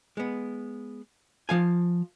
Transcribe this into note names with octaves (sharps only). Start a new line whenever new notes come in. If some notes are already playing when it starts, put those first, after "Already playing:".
G#3 B3
F3 F5 G#5